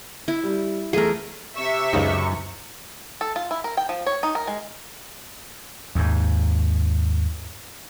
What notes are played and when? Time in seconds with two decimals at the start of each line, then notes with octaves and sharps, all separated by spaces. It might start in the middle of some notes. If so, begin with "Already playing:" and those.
0.28 E4
0.44 G3
0.93 E2 A3 G#4 A#4
1.56 C3 E5 C#6
1.93 C#2 F#2 C#3 D#4
3.21 A4
3.36 F4
3.51 E4
3.64 A#4
3.77 G5
3.89 F3
4.06 C#5
4.23 D#4
4.35 A#4
4.47 G#3
5.95 D#2 G#2